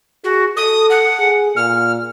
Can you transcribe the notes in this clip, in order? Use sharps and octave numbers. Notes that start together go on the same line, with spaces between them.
F#4 G#4
A4 D#6
F#5
G#4
A#2 F6